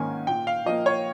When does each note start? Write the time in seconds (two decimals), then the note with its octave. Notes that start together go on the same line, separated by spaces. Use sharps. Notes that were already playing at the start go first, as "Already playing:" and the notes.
Already playing: G#2 D#3 A#3 C#4 G#5
0.27 A#2 G5
0.47 F5
0.66 F3 A#3 D#5
0.86 C#5